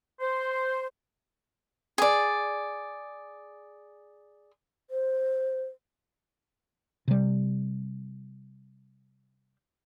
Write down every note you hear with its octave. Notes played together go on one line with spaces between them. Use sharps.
C5
G#4 D5
C5
C3 G3